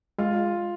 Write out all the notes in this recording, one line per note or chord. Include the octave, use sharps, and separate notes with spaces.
G#3 F4